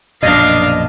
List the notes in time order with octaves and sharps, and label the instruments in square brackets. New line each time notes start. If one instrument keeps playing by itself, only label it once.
[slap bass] A#1 F#2 B2 [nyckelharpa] D4 F5 [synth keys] D#5